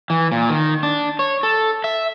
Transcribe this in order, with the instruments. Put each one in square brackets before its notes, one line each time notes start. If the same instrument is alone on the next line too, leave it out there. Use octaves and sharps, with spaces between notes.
[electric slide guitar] E3
A#2
D#3
D4
C#5
A4
E5